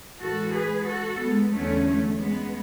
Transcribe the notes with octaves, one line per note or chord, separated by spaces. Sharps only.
A2 E3 G#3 F#4 A4
G#4 B4
F#4 A4
G#3 B3
E2 D3 F#3 A3 C#4
A3
G#3 B3